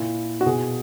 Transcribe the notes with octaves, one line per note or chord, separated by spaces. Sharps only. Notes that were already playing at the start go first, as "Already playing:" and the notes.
Already playing: A#2 E4
F#4
B2 G#4